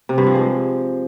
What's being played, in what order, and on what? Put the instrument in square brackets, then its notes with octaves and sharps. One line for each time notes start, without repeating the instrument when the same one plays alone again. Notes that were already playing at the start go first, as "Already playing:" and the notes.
[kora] C3
G2
F3
G#3